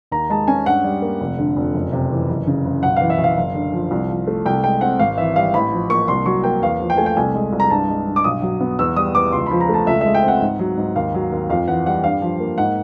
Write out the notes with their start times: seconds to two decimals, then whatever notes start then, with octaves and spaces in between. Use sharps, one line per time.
0.11 D#2 A#5
0.30 G#3 A5
0.48 C#4 G#5
0.66 G2 F#5
0.84 G3
1.02 A#3
1.20 F1
1.38 D3
1.56 F1
1.74 F#1
1.93 C3
2.11 E3
2.29 F#1
2.47 C#3
2.65 F#1
2.83 B1 F#5
2.96 E3 F5
3.10 E5
3.18 B1
3.24 F5
3.37 F#1
3.55 D3
3.73 F3
3.91 C2
4.10 F3
4.27 A3
4.46 C2 G5
4.64 G#3 G5
4.81 C4 F#5
4.99 G#1 F5
5.18 E3 E5
5.36 G3 F5
5.54 A1 B5
5.72 F3
5.90 A#3 C#6
6.08 C2 C6
6.26 F#3 C#6
6.44 A#3 G5
6.62 E2 F5
6.80 F3
6.90 G5
6.97 A3 G#5
7.06 G5
7.16 C2 G#5
7.35 G#3
7.53 C2
7.60 A#5
7.70 G2 A5
7.89 G#3
8.07 G2
8.16 D6
8.24 B1 D#6
8.42 F#3
8.61 B3
8.79 E2 E6
8.96 G3 D#6
9.15 E2 D6
9.32 C#2 C6
9.46 B5
9.51 F3
9.61 A#5
9.69 A3 A5
9.87 C#2 E5
10.01 G#3 E5
10.15 G5
10.23 C4 F#5
10.42 G#2
10.59 F#3
10.78 G#2
10.96 D#2 F5
11.14 F#3
11.32 D#2
11.49 F2 F5
11.68 E3 F#5
11.86 G3 F#5
12.04 G2 F5
12.22 F3
12.40 A#3
12.58 G#2 F#5